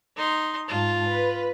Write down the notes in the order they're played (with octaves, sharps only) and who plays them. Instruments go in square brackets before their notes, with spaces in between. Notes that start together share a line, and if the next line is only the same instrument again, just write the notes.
[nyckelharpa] D#4 C6
[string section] G#2 A5 [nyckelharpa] F4
[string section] B4